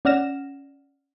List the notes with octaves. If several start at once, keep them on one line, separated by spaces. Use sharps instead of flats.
C#4 D5 F#5 F6 A#6 E7